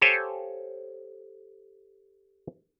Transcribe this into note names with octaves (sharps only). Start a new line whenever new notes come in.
G4 A4 C5 C#5 F5 G#5